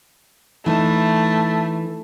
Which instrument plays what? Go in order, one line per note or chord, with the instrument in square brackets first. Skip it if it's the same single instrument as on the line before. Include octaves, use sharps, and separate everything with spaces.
[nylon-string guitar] E3 D#4 [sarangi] A3